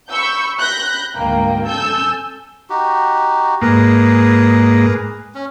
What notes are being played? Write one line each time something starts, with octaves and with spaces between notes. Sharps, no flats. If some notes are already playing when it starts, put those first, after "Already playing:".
B5 C#6 E6 G6
B5 F#6 G6 A#6
D2 G#2 A#3 G5
A4 G#5 E6 G6
D#4 F#4 G4
G#2 A#3 G#4 B4
C#4